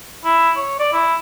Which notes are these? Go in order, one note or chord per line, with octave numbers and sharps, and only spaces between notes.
E4
C#5
D5
E4